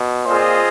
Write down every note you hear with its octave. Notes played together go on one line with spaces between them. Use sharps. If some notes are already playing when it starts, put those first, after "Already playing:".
Already playing: B2
A#2 C4 F4 G#4 C5 D#5